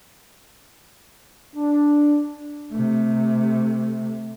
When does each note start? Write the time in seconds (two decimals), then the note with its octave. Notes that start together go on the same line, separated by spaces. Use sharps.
1.56 D4
2.72 C3 A3